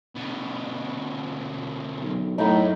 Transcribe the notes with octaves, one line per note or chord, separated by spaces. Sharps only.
B2 D3
B1
F#2 A2 D#4 B5